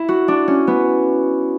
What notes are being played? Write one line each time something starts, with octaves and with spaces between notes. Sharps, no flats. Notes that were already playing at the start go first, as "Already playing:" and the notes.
Already playing: E4
F#4
D4
C#4
B3